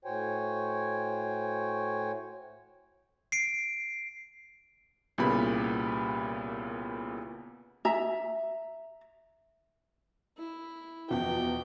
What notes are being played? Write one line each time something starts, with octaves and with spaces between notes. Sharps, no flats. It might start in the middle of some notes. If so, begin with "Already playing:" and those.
A2 F#4 C5 C#5 G5 G#5
C7 D7
C2 A#2 C#3 B3 G4 B5
E5 A#5
E4
E2 B2 F3 G5